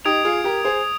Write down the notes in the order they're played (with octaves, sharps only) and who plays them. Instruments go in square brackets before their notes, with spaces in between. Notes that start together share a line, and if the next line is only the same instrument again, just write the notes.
[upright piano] D#4 G4 [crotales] D#6 G#6 D7 F7
[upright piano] F4 G#4
G4 A#4
G#4 C5